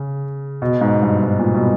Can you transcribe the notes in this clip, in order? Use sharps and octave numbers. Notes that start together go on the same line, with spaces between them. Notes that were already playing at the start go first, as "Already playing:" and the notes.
Already playing: C#3
B2
G#2
G2
G#2
A#2
B2